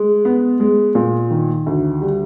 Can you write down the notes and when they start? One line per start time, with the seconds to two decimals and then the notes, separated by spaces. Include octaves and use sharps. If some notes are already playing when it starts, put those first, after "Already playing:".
Already playing: G#3
0.25 B3
0.60 G#3
0.95 A#2
1.30 D#3
1.66 D2
2.01 G3